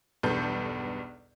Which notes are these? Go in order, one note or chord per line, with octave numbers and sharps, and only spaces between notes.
B1 E2 G2 B3 A4 G6